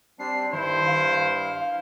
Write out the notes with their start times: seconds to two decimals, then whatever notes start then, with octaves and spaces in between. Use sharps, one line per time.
0.19 G3 C4 D4 C7
0.53 G2 D#3 E4 C5
0.86 F5